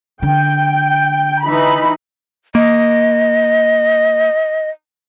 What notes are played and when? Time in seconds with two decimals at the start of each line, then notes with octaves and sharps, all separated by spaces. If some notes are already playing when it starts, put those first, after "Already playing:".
0.22 D3 G5
1.44 E3 D#4 B5
2.55 A#3 D#5